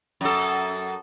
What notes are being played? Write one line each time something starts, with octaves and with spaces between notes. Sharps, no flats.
F#2 A4